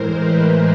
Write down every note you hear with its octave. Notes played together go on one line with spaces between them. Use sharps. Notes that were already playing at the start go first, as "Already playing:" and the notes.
Already playing: A2 E3 G#3 A#4 C5
B4